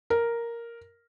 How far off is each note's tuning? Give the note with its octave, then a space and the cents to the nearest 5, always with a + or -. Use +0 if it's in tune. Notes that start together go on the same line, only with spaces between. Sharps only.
A#4 +0